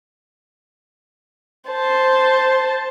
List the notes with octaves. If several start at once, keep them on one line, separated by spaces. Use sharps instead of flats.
C5 A5